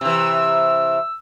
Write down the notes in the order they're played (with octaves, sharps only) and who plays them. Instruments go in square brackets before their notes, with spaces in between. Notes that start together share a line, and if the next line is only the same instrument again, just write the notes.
[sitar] C3 E3 [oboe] E6